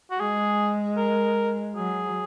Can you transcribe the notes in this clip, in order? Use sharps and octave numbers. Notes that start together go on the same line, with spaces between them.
F#4
G#3 G#4
A#4
F#3 G#4